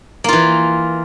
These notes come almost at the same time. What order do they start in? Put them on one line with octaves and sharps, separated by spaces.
A#3 F4 E3